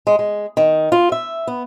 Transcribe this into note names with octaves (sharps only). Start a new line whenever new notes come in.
G#3
G#3
D#3
F4
E5
B3